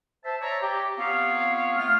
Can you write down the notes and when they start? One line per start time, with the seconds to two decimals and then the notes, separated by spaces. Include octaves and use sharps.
0.25 C5 E5 A5
0.42 C#5 D5 E5 A#5
0.62 G4
0.98 B3 C4 F4 C#5 F5
1.77 A3 F4 F6